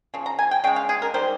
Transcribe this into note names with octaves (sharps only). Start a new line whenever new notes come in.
C#3 F3
A#5
G#5
G5
C#3 G#3 G5
F5
G#4
A#4
D#3 G3 C5